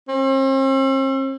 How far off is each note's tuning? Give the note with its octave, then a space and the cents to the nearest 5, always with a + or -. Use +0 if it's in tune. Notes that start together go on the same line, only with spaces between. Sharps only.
C4 +45